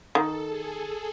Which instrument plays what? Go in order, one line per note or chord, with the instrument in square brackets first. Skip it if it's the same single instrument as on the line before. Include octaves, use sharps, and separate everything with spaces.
[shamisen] D#3 [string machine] A4
[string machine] G#4